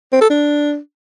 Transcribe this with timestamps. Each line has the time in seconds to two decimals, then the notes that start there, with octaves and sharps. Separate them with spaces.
0.12 C4
0.21 A4
0.30 D4